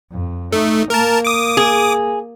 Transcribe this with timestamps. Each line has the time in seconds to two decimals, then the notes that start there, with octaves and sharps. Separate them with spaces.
0.11 F2
0.53 A3 D#4
0.90 A#3 A#4 A5
1.25 D6 D#6
1.57 G#4